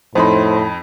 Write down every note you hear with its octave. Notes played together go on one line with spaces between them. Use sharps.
F2 A2 D#4 C5 B5 C6